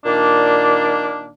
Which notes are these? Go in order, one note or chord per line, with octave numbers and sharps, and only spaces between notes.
A#2 D#3 A#3 D4